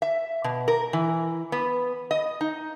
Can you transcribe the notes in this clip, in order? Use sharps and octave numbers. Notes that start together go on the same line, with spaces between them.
E5
B2
A#4
E3
B3
D#5
D#4